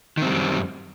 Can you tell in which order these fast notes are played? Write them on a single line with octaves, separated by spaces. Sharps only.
D#3 C4 G3 F#2